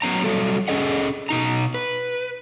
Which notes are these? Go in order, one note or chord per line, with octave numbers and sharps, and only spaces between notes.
F#3 B3 C#4 A#5
F#3 G3 A4
C#4 D#4 G#4 A4 D#5 F#5
B2 D#4 A#5
B4